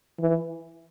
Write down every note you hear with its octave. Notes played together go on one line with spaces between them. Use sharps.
E3